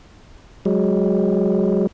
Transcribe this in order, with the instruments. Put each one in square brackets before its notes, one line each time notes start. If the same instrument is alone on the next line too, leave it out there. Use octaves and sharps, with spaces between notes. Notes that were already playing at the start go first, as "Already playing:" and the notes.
[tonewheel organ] F#3 G#3